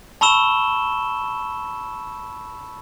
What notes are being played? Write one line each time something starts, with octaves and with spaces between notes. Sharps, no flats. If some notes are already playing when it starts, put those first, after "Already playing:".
A5 B5 C#6 E6 E7 G7